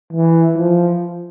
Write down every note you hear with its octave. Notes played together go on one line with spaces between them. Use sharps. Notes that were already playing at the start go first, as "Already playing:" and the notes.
E3
F3